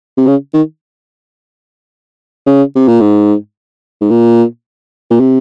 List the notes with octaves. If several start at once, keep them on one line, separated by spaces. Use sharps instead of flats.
C3
C#3
D#3
C#3
C3
A#2
G#2
G#2
A#2
A#2
C3